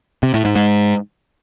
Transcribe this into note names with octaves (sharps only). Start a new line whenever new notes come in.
C3
A2
G#2
G#2